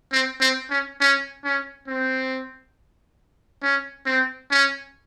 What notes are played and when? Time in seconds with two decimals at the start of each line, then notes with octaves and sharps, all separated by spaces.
0.12 C4
0.41 C4
0.70 C#4
1.00 C#4
1.44 C#4
1.87 C4
3.63 C#4
4.06 C4
4.51 C#4